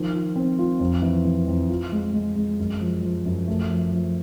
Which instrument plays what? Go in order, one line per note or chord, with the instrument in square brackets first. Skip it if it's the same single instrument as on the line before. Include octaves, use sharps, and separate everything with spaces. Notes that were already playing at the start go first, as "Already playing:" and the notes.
Already playing: [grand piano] D#3 F3
F4
C4
F4
F2
E3
E3
F2
F4
G#3
G#3
G#3
F#2
F3
F3
F#2
A3
F3
F3